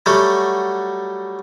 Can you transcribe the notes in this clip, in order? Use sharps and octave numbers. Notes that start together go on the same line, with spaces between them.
F#3 G3 A3 F#4